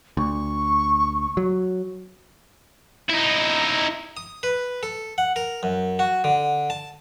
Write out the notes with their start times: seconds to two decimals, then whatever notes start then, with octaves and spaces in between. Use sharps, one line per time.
0.17 D2 C#6
1.37 F#3
3.09 D#4 E4
4.17 D#6
4.43 B4
4.83 A4
5.18 F#5
5.36 A#4
5.63 F#2
5.99 F#4
6.24 D3
6.70 A5